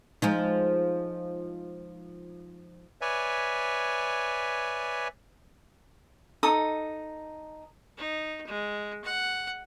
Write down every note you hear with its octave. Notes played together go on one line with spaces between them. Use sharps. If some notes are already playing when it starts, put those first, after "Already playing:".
F3 G#3 D#4
B4 C#5 D5 E5 G#5
D#4 A4 D#6
D#4
G#3
F#5